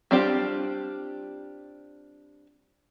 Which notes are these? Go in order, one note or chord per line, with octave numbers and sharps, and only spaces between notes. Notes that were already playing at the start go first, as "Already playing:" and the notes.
G3 C4 D4 F4 G4